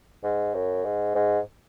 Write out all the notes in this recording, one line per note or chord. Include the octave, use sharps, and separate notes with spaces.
G#2
F#2
G#2
G#2